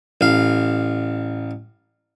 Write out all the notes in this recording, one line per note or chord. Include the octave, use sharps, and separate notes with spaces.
A1 F5